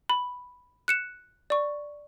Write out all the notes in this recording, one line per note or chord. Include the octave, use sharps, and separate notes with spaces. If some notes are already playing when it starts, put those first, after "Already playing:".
B5
F#6 C#7 E7
D5 C#6